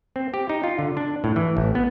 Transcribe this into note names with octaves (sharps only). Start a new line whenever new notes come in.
C4
G4
D#4
F4
D3
D4
A2
E3
A1
B3